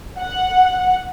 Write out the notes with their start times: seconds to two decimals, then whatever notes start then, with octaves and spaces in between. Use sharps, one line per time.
0.19 F#5